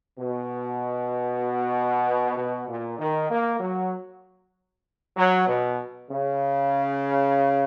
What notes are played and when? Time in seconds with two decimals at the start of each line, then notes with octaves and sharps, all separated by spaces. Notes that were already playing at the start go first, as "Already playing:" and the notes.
0.18 B2
2.36 B2
2.67 A#2
2.99 D#3
3.29 A#3
3.60 F#3
5.17 F#3
5.47 B2
6.10 C#3